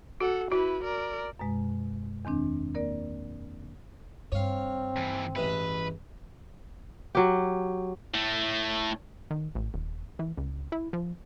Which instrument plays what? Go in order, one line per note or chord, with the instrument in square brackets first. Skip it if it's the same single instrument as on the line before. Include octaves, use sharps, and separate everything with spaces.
[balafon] F#4 [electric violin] A4 F#5
[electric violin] E4 B4 [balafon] F#4
[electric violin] A#4 D5
[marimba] F#2 B2 G#3
E2 D#3 C4 D4
A#3 A#4 D5
[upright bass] G2 [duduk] C4 [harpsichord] C#5 F5
[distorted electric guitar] D#2 E3
[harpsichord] A1 E3 G#3 [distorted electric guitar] B4
[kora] F#3 G4
[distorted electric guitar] A2 A3
[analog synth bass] D#3
A1
D#1
E3
C#2
E4
F3